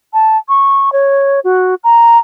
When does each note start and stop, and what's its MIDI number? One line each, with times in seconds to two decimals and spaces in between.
0.13 0.37 81
0.49 0.92 85
0.92 1.40 73
1.44 1.75 66
1.84 2.18 82